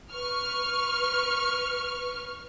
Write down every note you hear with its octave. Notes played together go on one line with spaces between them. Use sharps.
B4 C#6 F6